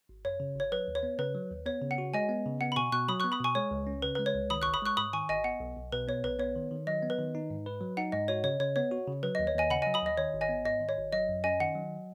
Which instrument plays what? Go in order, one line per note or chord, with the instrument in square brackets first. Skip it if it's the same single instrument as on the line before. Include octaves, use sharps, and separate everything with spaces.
[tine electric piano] G#1
[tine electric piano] F#2 [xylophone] C#5
[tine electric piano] C#3
[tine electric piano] G#1 [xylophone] C#5
[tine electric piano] F#3 [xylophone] B4
[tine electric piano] D#2
[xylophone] C#5
[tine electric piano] B3
[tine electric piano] C#3 [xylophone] B4
[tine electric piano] F#3
D#2
[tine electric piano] B3 [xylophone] C#5
[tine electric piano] C#3
[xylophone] F#5
[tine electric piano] F#4
[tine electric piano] G#3 [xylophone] D#5 G#5
[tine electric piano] B3
C#3
[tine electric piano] B3 [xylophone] F#5
[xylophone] B5
[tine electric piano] B2 [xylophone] G#5 C#6
[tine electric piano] B2 [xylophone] C#6 F#6
[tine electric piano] F#3 [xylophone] B5 D#6
[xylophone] C#6 F#6
[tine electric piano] B3
[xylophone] B5 D#6
[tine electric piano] B2 [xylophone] G#5 C#6
[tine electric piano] G#3 [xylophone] C#5
[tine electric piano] C#2
C#4
[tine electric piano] C#3 [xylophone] B4
[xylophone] B4
[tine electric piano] G#3
[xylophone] C#5
[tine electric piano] C#2
[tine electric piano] D#3 [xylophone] B5 D#6
[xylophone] C#6 F#6
[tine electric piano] G#1
[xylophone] B5 D#6
[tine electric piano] G#3 [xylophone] C#6 F#6
[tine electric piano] G#2 [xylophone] B5 D#6
[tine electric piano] D#3 [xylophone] G#5 C#6
[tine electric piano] G#1 [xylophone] D#5 G#5
[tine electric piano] B3 [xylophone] F#5
[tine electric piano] B1
B1
[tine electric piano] B2 [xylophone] B4
[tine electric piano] B3 [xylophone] C#5
[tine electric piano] B1 [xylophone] B4
[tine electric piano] B3 [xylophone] C#5
[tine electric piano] D#3
D#3
[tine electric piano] F#3 [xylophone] D#5
[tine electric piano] B3
[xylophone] B4
[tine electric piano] D#3
D#4
G#2
B4
F#3
[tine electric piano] D#4 [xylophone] F#5
[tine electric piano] G#2 [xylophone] D#5
[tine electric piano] F#4 [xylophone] C#5
[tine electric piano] C#3 [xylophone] C#5
[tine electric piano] C#3 [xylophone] C#5
[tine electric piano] B3 [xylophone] C#5
[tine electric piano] F#4
C#3
[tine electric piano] F#3 [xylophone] B4
[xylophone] D#5
[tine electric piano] D#2
[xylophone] C#5
[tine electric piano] D#2 [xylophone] D#5 G#5
[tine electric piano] C#3 [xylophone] F#5 B5
[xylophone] D#5 G#5
[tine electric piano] F#3
[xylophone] B5 D#6
[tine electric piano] D#2 [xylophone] D#5
[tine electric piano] D#3 [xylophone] C#5
[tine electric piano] G#1
[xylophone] D#5 G#5
[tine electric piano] B3
[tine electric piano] G#2 [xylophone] D#5
[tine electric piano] D#3
[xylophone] C#5
[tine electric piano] G#1
[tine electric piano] F#3 [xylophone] D#5
[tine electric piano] F#2
[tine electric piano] C#4 [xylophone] D#5 G#5
[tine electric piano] D#3 [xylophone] F#5
[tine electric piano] F#3